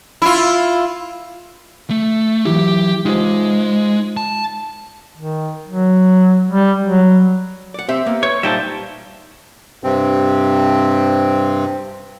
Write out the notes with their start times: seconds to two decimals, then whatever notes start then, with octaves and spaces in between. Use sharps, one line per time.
0.22 E4 F4
1.90 A3
2.45 E3 F#3 E4 G4
3.05 G#3 D#4 F4 C5
4.17 A5
5.17 D#3
5.67 F#3
6.51 G3
6.84 F#3
7.74 D5 F#5
7.89 C4 G4 C5 E5
8.06 A#3 B3
8.23 B4 C#5
8.43 A#2 G3 D#4 C5 E5 G5 A5
9.84 G2 C3 C4